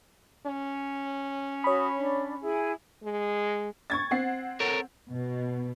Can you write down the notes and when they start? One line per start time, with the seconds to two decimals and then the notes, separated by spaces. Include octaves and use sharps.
0.47 C#4
1.64 F#4 C#5 B5 D#6
1.97 D4
2.42 E4 G#4 G#5
3.03 G#3
3.90 C#6 G#6 A6
4.11 C4 F#5 C7
4.60 A4 A#4 C#5
5.11 B2